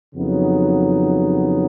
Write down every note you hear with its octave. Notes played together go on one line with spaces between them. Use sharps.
F2 C#3 F#3 B3 D#4